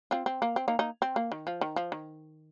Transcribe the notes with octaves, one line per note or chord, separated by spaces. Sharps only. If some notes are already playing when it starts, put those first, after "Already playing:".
C4 F4
C4
A#3
C4
A#3 D#4
A#3 D#4
C4
A#3
D#3
F3
D#3
F3
D#3